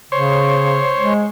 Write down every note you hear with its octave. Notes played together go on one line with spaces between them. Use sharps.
C#3 C5 C#5
G#3